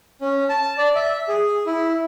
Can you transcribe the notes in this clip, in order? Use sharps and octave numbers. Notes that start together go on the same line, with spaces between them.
C#4
A5
D5
E5
G#4
E4